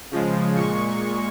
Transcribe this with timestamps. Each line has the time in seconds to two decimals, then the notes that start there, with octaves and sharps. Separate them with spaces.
0.11 C#3 F3 G#3
0.56 A#2 G#3 C#6